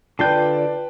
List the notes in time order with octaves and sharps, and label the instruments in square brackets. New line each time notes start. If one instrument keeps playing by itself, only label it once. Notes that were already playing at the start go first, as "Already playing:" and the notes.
[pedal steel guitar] D3 F4 G6 [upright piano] B4 G5 A5 [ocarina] D5